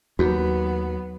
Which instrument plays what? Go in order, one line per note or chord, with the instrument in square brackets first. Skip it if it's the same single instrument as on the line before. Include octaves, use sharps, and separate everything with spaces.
[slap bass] D#2 [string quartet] F#3 B3 [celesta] F#4